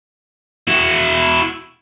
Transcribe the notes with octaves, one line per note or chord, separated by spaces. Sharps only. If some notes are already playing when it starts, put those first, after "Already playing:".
E4 F#4